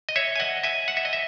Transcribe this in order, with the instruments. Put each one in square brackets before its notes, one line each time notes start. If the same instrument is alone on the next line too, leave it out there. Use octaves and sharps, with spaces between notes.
[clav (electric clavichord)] D#5
C#5 E5
G#5
D#5 F#5
E5 G#5
F#5
E5
D#5
E5